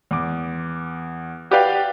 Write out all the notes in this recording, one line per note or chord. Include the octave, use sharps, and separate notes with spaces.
E2 D6
F#4 G4 B4 D5 F5 G5